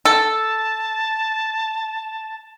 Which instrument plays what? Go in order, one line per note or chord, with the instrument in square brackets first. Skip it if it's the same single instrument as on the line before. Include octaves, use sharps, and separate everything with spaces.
[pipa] A4 [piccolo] A5